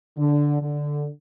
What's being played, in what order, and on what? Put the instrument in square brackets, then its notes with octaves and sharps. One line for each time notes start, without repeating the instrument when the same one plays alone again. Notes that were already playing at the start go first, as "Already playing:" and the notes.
[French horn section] D3
D3